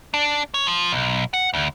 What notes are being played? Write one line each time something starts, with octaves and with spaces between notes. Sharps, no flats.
D4
C#5
F3
B1
F#5
D2